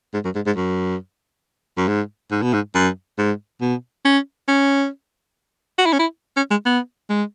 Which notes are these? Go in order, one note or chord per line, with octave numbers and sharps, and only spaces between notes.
G#2
F#2
G#2
G#2
F#2
F#2
G#2
G#2
B2
G#2
F#2
G#2
B2
C#4
C#4
F#4
E4
C#4
E4
C#4
G#3
B3
G#3